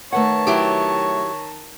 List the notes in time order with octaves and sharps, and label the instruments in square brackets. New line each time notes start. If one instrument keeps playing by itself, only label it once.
[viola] D#3 A5 [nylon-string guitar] A3 B4 F#5 [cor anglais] C#5
[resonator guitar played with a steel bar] F#3 E4 G4